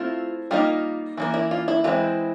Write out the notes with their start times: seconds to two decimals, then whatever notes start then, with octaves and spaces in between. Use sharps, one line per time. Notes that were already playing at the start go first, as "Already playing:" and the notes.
Already playing: A3 C4 E4 F4
0.51 G3 A#3 D#4 F4
1.17 E3 G3 A#3
1.34 E4
1.51 F4
1.68 E4
1.84 E3 G#3 C4 E4 F4